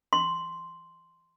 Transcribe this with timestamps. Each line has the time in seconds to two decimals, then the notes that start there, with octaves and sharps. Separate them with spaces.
0.13 C6